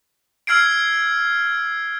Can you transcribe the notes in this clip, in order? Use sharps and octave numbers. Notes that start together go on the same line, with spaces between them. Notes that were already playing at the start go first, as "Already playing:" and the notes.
E6 F6 G#6 C7 D7